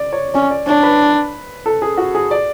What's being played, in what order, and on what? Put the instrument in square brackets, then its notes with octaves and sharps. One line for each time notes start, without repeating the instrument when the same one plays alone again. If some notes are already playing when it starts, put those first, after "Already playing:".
Already playing: [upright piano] D5
C#5
[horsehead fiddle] C#4 [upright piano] D5
[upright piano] D5
[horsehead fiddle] D4 [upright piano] C#5
[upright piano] B4
A4
G#4
F#4
G#4
D5